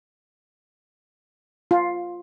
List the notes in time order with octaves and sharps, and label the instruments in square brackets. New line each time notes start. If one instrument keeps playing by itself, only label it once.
[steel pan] F4